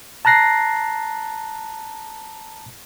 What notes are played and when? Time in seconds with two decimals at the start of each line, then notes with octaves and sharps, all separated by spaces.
0.25 A5 A#5 F#6 A#6 C7